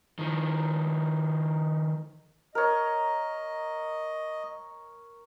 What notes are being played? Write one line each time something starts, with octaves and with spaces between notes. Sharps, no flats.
D#3 F3
A#4 C#5 D#5